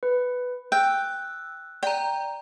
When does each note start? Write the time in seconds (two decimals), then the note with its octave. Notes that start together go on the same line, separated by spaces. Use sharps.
0.03 B4
0.72 G5 E6 F#6
1.83 D5 G5 A#5